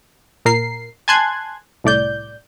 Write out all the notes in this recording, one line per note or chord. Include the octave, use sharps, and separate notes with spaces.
A#2 A#4 C7
G#5 A5 C6 F#6 G#6
C2 A2 D5 G6